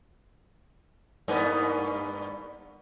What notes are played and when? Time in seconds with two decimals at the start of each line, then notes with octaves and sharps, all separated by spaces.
1.28 G2 A#3 B3